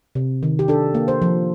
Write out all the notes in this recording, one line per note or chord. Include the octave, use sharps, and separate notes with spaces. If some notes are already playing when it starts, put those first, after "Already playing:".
C3
D#3
G4
D4 A4
A#3
C5
F3